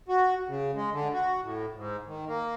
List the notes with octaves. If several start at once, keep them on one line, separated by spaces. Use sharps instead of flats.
F#4
C#3
G#3
D3
F#4
A2
G#2
D#3
A#3